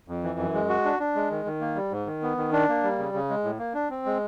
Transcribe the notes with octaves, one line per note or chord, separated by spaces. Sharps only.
F2
E3
F#2
G#3
F#4
D4
D4
G#3
D#3
D#3
A#3
G3
G#2
D#3
B3
D#3
D4
A#3
G3
C#3
C#3
G#3
A2
A#3
D4
C4
G#3